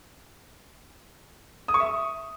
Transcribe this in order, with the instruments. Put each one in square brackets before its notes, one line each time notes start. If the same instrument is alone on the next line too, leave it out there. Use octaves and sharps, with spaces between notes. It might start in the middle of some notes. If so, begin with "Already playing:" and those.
[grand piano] D#6
C#6
E5